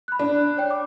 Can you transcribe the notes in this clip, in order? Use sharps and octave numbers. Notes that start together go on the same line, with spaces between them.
B5 F#6
D4
C#5 G5
D6